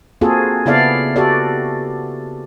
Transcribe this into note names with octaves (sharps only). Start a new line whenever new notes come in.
A#3 C4 F4 F#4 G#4 A4
C#3 B3 E4 A4 D5 F5
F#4 G4 A4 D5